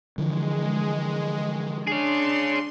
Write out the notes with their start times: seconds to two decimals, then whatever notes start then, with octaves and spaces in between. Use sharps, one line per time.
0.18 D3 E3 F3 G#3
1.87 D4 G#4 C#5 C6